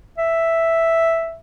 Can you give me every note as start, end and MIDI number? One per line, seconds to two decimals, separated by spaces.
0.18 1.37 76